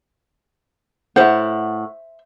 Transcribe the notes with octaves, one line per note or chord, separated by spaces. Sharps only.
A2 C5 E5 F#5